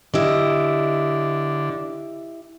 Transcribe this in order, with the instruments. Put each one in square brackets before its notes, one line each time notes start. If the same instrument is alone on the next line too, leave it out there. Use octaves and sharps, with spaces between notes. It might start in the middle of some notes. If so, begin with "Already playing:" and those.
[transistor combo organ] D3 [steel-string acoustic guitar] E4 G4 D#5